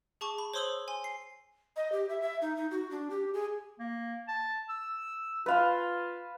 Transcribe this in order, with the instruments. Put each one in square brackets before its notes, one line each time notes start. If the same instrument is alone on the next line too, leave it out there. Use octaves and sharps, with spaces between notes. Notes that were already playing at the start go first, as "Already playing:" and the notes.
[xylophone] G#4 A5 C#6 D6
B5
C5 C#5 C6 D#6 E6 F#7
G#5 C6
C7
[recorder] D#5
G4
E5
E5
D#4
D#4
F#4
D4
G4
G#4
[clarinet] A#3
A5
E6
[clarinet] F4 [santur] B4 F5 A5